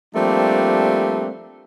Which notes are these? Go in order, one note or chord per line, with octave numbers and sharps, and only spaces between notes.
F3 G3 A3 A#3 C4 D4